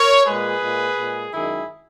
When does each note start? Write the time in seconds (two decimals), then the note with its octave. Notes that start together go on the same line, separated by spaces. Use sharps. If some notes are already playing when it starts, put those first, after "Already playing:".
Already playing: A#4 C#5
0.25 A#2 G#3 G#4 B4
0.62 A#2 G#3
0.97 A#2 G#3
1.33 F#2 D#3 G#3 E4 G#4